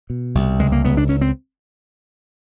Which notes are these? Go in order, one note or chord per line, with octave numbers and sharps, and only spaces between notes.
B2
C2
C#2 G#3
A#3
C#2 B3
D4
C#2 C#4
C4